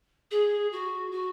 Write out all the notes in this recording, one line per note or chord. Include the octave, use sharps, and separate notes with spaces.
G#4
F#4
F#4